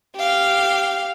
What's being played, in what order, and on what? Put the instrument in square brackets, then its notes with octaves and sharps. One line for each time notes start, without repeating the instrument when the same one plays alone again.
[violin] G4 F5